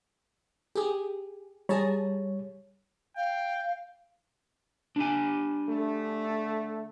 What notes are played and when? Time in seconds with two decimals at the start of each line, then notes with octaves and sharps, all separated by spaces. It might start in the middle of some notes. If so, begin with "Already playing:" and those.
0.75 G4 G#4
1.69 G3 G#4 C#5 A5 A#5
3.17 F5 G5
4.96 D4 G4 G#5
5.68 D3 A3